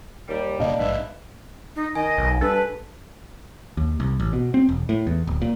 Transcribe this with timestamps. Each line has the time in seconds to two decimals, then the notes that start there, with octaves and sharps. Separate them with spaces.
0.28 D#2 G3
0.60 F1 A#2 C#3 D4 D#5 F5
0.79 A#1 G#2 B4 E5
1.76 D#4
1.95 D#3 D#5 G#5
2.18 B1
2.41 G2 A4 B4
3.77 D#2
4.00 C2
4.20 A1
4.33 B2
4.54 C4
4.69 E1
4.89 A2
5.07 E2
5.27 D1
5.42 A#2